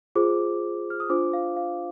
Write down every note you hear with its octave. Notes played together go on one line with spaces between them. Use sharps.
F4 G#4 C5 D6
F6
D#6
D4 F4 C5 D6
F5
F5